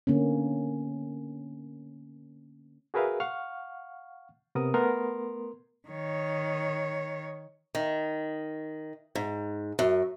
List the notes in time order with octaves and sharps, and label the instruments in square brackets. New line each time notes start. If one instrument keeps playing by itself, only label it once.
[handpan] D3 A#3 B3 C#4
[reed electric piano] F#4 G#4 A#4 B4 E5 F5
F5 F#5 C#6 F6
C3 B3 A#4 D#6
A3 B3 A#4 C6
[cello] D#3 C#5
[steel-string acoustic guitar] D#3
G#2
F#2